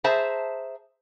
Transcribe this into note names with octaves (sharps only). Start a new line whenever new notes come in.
G#4 C5 E5 A5 A#5